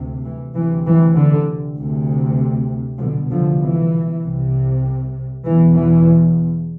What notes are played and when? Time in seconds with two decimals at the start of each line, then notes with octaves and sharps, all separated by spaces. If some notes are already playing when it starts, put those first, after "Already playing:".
Already playing: D2 C3
0.24 E3
0.55 D2 C3 E3
0.86 E3
1.16 D3
1.78 D2 C3
3.00 C2 B2 D3 F3
3.31 D3 F3
3.61 E3
4.23 C2 C3
5.45 E2 B2 E3
5.75 E3